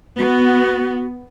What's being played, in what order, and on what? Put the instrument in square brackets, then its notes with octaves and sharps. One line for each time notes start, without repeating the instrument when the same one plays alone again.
[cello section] B3 [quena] F#4